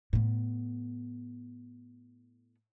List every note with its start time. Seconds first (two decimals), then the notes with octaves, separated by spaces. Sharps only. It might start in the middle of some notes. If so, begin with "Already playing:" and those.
0.13 A2 B3